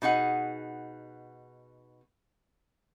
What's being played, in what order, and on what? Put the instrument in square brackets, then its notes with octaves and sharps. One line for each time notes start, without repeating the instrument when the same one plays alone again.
[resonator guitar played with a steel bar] B2 D#4 G#4 F#5